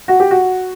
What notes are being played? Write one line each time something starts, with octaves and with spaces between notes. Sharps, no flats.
F#4
G4
F#4